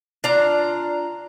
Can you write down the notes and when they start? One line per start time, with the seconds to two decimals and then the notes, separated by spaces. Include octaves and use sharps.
0.24 D4 F4 A#5